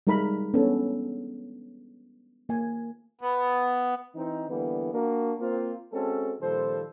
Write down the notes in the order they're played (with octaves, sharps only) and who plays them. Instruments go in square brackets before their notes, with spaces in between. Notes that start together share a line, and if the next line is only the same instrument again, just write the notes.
[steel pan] G3 G#3 D#4 A#4 A#5 B5
B3 C#4 D4 A4
A#3 G#5
[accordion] B3
[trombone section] E3 C4 D#4
D3 E3 G3 A#3 B3
A#3 D4 F#4
A#3 C4 F4
G#3 C4 C#4 F#4 A4
A#2 D#3 F3 G3 A4 C5